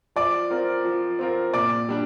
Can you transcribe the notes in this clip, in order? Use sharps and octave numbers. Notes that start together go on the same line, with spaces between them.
F3 D5 D6
C4 F4 A#4
F3
C4 F4 A#4
A#2 D5 D6
G3 D4